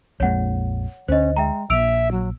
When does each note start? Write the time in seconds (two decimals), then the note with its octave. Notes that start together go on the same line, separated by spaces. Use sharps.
0.20 A#1 F2 G#3 C#5 F#5
1.08 D2 C#4 C5 D#5
1.36 G#3 E5 G5 A#5
1.70 A#1 E5 E6 D7 F7
2.11 F#3